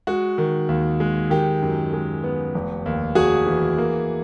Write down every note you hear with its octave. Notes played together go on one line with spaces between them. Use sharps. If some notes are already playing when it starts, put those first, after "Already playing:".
G#3 F#4
D#3
D#2
G#3
D#3 G4
F#2
G#3
B3
F1
D#2
F1 F#4 G#4
E3
A#3